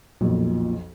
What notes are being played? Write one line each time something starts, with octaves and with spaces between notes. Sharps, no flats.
B1 F2 A#2